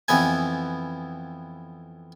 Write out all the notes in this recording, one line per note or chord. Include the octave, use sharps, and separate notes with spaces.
F2 E3 B3 G#5